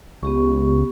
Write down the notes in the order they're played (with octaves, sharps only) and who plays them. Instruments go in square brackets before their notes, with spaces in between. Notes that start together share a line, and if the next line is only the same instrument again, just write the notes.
[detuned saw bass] C#2 [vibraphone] B3 G4 C#6